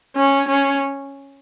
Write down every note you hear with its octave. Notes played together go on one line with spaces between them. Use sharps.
C#4
C#4